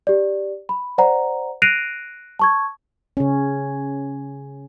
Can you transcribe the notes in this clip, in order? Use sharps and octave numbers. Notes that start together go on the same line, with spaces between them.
G4 D5
B5
C5 D5 F#5 A#5
F#6 A#6 C7 D7 D#7 F7
A5 C#6 G#6
C#3 C#4